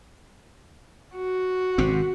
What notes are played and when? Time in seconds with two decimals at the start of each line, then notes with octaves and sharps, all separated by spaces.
1.16 F#4
1.78 G#1 C3 C4